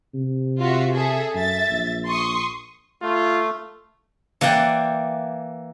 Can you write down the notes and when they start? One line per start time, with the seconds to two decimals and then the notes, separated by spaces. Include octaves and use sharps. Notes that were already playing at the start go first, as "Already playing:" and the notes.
0.14 C3
0.59 F4 F#4 E5
0.94 G#4 A4 E5
1.34 F#2 E5 A6
1.70 A#1
2.07 C6 C#6 D#6
3.02 A3 F4
4.41 E3 A#3 D5 F#5 G5